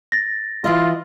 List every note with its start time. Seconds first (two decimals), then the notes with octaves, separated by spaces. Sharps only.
0.12 A6 A#6
0.64 E3 E4 F4 D#5